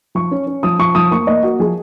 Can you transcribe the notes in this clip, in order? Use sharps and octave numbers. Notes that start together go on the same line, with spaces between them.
F3 C#6
C#4
C#4
F3 D#6
F3 C#6
F3 D#6
A#3 C#6
A#3 D#5
A#3 F#4
F3 G#4